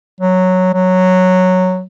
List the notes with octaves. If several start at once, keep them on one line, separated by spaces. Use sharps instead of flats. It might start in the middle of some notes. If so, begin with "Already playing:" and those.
F#3
F#3